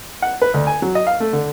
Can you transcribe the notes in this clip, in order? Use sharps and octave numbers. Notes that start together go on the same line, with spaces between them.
F#5
B4
D2
G#5
F#3
D#5
F5
A3
D3